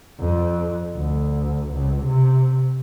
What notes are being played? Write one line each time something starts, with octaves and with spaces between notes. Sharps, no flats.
F2
D2
C#2
C3